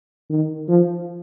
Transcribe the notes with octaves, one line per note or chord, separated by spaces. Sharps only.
D#3
F3